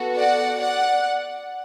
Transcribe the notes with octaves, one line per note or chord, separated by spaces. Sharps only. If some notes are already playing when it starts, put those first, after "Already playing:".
Already playing: B3 F#4 A4
D5 F#5
D5 F#5